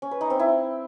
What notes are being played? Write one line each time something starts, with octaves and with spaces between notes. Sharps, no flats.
C#4
B4
D#4
C4
E4